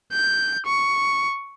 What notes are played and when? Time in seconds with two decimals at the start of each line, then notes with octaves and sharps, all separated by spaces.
0.13 G6
0.66 C#6